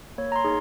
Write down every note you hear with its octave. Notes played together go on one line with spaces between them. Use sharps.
A#3 C#5
A#5
C6
D#4 G#4